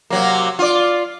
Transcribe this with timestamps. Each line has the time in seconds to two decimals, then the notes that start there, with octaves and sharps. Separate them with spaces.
0.10 C3 F#3 A#3
0.59 F4 D5